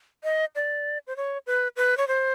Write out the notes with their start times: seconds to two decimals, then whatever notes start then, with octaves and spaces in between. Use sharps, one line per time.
0.24 D#5
0.55 D5
1.07 C5
1.17 C#5
1.47 B4
1.77 B4
1.97 C#5
2.08 C5